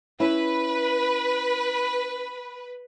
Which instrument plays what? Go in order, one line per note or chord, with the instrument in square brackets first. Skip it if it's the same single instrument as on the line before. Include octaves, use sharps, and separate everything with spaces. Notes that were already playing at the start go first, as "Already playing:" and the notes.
[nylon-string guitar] C#4 E4 [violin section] B4